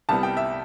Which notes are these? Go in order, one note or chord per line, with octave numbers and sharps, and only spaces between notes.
C2 C3 G3 B3 A5
G5
E5